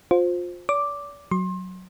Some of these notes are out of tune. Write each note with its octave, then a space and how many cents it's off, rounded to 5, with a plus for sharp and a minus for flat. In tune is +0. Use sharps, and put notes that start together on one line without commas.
F4 +25 C5 +0
D5 -45 D6 +0
F#3 +0 C6 +30